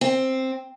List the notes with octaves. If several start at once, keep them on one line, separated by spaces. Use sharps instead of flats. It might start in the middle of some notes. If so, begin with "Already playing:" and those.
C4